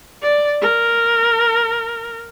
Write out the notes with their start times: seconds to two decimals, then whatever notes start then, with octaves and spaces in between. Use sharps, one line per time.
0.22 D5
0.61 A#4